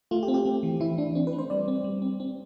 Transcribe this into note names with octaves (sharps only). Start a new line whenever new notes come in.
A3 F4
G4
C4
G4
A3
E3
E3 E4
E3 D4
C4 D4
B4
A3
C5
G3 D5
C4
G3
C4
C4